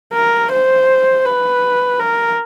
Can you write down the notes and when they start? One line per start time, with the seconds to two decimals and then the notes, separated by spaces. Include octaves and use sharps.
0.14 A#4
0.52 C5
1.26 B4
2.00 A#4